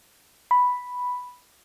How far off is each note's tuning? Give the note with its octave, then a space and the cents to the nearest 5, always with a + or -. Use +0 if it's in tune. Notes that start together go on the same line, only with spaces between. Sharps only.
B5 +0